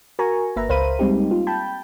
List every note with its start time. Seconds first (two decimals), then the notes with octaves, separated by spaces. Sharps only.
0.19 F#4 A#4 G#5 A#5 C#6
0.56 G1 A#3 B4 E5 A#5
0.69 C#2 A#4 C5 F5 B5 D#7
0.99 G3 G#3 A#3 C4 D#4 G4
1.31 F4
1.47 G5 A5 B5 G6